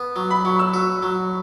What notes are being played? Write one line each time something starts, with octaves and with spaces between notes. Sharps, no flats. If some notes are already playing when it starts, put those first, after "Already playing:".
Already playing: B3
F#3
B5
F#3 C#6
E6
F#4
F#3